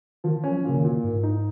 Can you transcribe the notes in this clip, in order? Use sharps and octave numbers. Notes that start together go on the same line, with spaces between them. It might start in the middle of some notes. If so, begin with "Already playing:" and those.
D#3 F3
C#4
F3
A#2 C#3
D#3
A#2
G#2 A#3
D#4